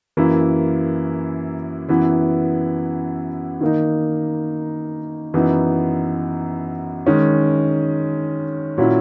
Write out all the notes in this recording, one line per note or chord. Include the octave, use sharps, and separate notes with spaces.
F#2 E3 A#3 E4
F#2 E3 B3 E4
D#3 A#3 D#4
F#2 E3 B3 D#4
D#3 G#3 C#4
A#2 F#3 C#4 E4